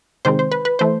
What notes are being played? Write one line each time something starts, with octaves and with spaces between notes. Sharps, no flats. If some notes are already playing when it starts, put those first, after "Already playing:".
C3 D#3 G#3 C4 C5
C5
B4
B4
E3 A3 C5